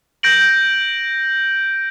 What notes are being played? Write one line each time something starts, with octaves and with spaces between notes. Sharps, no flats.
G6 A#6 D7 F#7